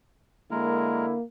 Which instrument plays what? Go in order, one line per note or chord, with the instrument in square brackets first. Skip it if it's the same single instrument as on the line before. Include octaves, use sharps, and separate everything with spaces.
[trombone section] D3 E4 [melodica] G#3 A#4 [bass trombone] A#3